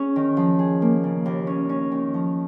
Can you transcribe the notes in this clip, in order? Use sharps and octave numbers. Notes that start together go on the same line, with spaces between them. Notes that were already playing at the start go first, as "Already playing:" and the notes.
Already playing: C#4 G#4
D#3
F3
G#4
A#3
C#3
D#2
C#4
C#4
D#3
F3